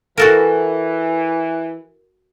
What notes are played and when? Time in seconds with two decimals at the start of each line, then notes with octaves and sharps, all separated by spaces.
0.18 E3 F#4 A4 A#4